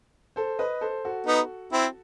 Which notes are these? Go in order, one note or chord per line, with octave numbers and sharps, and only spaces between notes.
A4 C5
B4 D#5
A4 C5
F#4 A4
B3 D#4
C4 E4